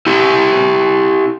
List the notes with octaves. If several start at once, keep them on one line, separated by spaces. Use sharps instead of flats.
E4 G4